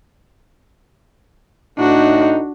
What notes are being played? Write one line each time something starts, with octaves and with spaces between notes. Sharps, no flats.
A2 D4 D#4 F#4